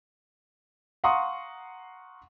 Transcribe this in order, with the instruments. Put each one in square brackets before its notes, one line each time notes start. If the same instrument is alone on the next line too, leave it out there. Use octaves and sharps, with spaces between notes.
[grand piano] F5 F#5 A#5 C6 C#6 D#6